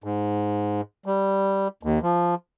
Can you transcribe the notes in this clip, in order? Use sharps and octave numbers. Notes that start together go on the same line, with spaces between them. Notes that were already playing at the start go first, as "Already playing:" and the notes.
G#2
G3
D#2
F3